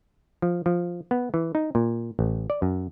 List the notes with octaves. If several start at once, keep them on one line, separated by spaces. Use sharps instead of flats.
F3
F3
B3
E3
D#4
A#2
A1
D5
F#2